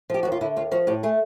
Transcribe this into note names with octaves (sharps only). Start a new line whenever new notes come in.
F3 G4
D#2 F#4
F4
D3 E4
D#2 F4
F3 F#4
A2 G4
A3 G#4